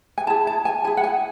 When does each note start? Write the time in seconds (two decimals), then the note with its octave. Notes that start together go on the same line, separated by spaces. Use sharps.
0.18 G#5
0.27 E4 G#4 A5
0.47 A5
0.65 G#5
0.84 E4 G#4 G#5
0.97 F#5
1.04 G#5